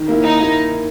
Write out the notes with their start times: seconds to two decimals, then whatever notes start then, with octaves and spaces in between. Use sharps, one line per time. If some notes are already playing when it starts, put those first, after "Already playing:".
Already playing: D#3
0.08 A#3 E4
0.23 D#3 D#4
0.39 A#3 E4